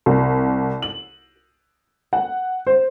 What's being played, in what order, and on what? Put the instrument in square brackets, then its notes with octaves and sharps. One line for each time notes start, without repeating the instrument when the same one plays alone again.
[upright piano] C2
F#7
F#5
C5